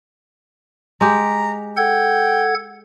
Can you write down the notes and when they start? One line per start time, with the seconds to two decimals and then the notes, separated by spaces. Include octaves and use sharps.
1.01 G#3 G4 A#5
1.77 A4 F#5 G5 G#6